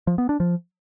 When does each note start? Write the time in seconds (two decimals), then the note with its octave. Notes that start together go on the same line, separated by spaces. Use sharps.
0.07 F3
0.18 B3
0.29 D4
0.40 F3